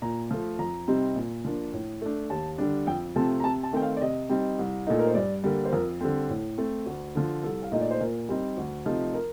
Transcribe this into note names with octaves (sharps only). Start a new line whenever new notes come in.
A#2 A#5
F3 A3
F2 A#5
C3 G3 C4 D#4
A#2
F3 A#3 D4
A2
A3 D4
D#2 A5
D3 G3 D4
F2 G5
C3 F3 A3 C4 A5
A#5
C3 A5
A5
D#3 A3 C4 G5
F5
D5
C3 D#5
G3 C4 D#4
C2
A#2 A3 D#4 A4
A#4
C5
G2 D5
D3 G3 A#3
C5
F2 A#4
D3 G3 C4 A4
A2
A3 C4
D2
D3 F3
C2 A4
F5
A#2 A3 D#4 D#5
D5
C5
A#2 A#4
G3 C4 D#4
D2
C3 F3 A3 D#4
A#4